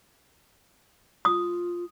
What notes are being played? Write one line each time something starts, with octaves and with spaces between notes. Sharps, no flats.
F4 D#6